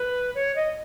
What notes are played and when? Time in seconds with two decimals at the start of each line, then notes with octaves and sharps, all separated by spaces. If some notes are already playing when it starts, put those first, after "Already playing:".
Already playing: B4
0.35 C#5
0.56 D#5